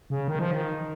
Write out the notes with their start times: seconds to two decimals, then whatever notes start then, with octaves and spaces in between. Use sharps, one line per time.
0.10 C#3
0.28 D#3
0.39 F3
0.51 D#3